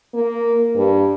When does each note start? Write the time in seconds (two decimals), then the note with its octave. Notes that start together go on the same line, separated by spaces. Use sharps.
0.14 A#3
0.76 G2